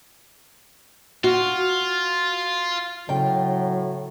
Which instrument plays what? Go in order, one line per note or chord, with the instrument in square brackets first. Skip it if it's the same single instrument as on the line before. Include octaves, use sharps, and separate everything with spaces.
[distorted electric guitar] F4 [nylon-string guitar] F#4
[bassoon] A2 [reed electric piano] C#3 [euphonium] F#3 [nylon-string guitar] G5